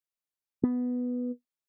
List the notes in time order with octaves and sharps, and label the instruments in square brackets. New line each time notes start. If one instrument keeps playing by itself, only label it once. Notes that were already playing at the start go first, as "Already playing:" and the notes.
[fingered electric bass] B3